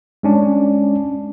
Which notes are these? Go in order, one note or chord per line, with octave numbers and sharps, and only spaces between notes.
G#3 C#4 D4